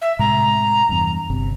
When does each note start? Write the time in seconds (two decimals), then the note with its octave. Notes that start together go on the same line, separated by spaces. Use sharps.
0.02 E5
0.19 A2 C3 G#3 A#5
0.89 E2 G2
1.30 G1 C3